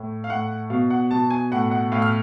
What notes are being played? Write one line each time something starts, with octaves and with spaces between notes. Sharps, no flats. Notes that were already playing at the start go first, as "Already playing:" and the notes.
Already playing: A2
F5
A2 F#5
B2 F5
F#5
B2 A5
G#5
A2 F#5
F#5
A2 F5
F6